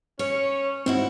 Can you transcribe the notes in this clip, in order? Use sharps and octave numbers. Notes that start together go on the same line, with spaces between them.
C#4 C#5
G#2 C4 E4 F#4